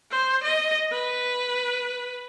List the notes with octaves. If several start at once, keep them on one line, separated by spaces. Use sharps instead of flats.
C5
D#5
B4